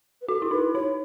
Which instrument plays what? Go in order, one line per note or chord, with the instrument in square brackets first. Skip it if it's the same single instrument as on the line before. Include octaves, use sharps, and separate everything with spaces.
[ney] B4
[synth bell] F#4 [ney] A4
[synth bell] E4
[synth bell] D#4 [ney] B4
[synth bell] D#4 [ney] C#5